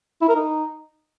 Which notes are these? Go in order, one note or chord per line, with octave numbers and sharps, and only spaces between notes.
E4
A#4
D#4